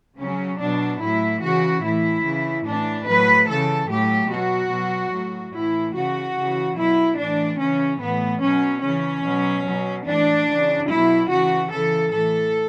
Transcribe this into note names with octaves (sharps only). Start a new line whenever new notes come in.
C#3 F#3 C#4
B2 F#3 D4
A2 F#3 E4
C#3 E3 F#4
A2 E3 E4
C#3 E3
A2 E3 D4
A2 F#3 B4
C#3 E3 A4
A2 F#3 G4
B2 F#3 F#4
B2 F#3
A2 F#3
A2 E3 E4
C#3 E3 F#4
C#3 E3
B2 F#3 E4
A2 E3 D4
C#3 E3 C#4
A2 E3 B3
B2 F#3 C#4
C#3 E3 C#4
B2 F#3
B2 F#3
A2 E3 D4
C#3 E3
B2 F#3 E4
C#3 E3 F#4
C#3 E3 A4
A2 E3 A4